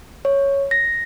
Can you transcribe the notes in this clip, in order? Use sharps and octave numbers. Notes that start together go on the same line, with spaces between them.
C#5
A#6